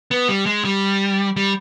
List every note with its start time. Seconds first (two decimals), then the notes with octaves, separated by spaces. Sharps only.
0.11 B3
0.28 G3
0.46 G#3
0.65 G3
1.36 G3